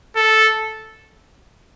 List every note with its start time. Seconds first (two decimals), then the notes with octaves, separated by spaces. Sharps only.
0.16 A4